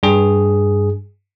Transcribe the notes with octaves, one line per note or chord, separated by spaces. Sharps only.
G2 G#4